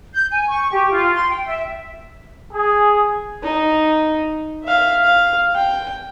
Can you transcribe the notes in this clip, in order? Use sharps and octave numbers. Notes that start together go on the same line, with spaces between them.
G6
G#5
C#6
G4
F4
C6
G5
E5
G#4
D#4
E5 F5
F5
G5